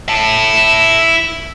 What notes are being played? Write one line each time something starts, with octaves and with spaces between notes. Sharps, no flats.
E4 A5